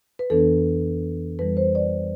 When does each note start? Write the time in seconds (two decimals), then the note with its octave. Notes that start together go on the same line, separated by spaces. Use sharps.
0.19 B4
0.30 F2 E3 B3 D4 A4
1.39 F2 E3 G3 B4
1.57 C5
1.75 D5